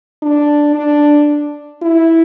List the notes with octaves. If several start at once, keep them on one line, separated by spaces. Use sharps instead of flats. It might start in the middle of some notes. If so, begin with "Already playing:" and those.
D4
D4
E4